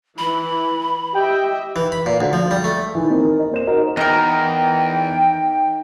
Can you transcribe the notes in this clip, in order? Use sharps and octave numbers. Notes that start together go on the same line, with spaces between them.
E3 B5
G4 D#5 E5 G5
E3
B5
A#2
D2
F3
G3
A3
D#3 E3
A#3 C4 D#4
A#4
D#5
A#3 C5 E7
D#4 F#4 A#4 C5 D#5
E2 D#4 A#4 G5